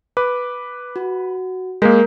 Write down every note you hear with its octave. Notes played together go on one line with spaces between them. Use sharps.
B4 D6
F#4
G#3 A#3 A#4 G6 B6